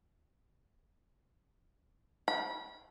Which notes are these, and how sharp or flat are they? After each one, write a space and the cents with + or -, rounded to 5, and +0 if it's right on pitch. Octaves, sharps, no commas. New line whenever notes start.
B5 -30